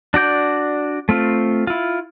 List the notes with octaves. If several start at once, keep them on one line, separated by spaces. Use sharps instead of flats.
D4 F#4 D5 G6
A3 C4 F4
E4 F4